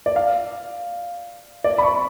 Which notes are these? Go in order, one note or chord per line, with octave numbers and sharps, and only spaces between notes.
D5
F5
D5
B5
C#6